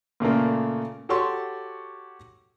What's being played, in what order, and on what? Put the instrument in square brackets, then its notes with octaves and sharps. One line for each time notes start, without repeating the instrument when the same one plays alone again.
[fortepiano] A#2 C#3 A3 A#3
F#4 G4 A4 C#5 C6 C#6